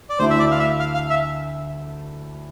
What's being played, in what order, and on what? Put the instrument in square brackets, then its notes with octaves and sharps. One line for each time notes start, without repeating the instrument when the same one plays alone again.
[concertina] D5
[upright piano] D2 D3 A3 E4 [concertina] C5
[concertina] E5
D5
F5
E5
F5
F5
E5